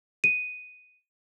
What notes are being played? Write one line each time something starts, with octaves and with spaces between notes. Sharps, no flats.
D#7